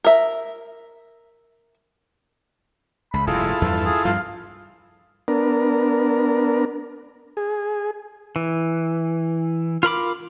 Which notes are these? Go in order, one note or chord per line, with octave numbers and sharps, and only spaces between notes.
A#4 E5
C#2 B5
F1 G2 A#2 E4 F4 G#4 A4
E2 G2 F3
G#4
G2 F3 F5
B3 D4 A#4
G#4
E3
F4 A#4 B5 D6